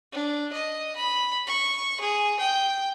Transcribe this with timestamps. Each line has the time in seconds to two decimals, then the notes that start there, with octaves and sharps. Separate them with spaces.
0.12 D4
0.53 D#5
0.96 B5
1.47 C#6
2.01 G#4
2.40 G5